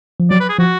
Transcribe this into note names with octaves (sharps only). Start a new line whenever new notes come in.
F3
F#3 D5
B4
G#4
F3 F#4